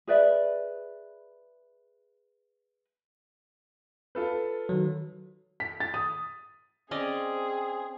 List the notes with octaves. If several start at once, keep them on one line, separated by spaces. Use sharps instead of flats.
G#4 B4 D5 E5
F4 A4 B4
D#3 F#3
B6
A6
D#6
C4 C#4 G#4 D5 D#5